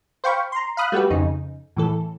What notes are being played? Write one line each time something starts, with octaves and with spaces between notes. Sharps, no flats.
C5 F5 G5 B5 C#6
A#5 C6
F5 B5 D#6 F#6
G3 A3 F#4 G4 B4
F2 C#3 D#4
A2 E3 A4